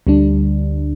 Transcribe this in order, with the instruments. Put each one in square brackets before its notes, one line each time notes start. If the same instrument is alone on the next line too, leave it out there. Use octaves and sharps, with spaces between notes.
[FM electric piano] D2 D3 G3 D4